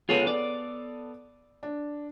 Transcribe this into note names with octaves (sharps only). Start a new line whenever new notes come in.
B3 F4 G#4 A4 C#5
D5
D4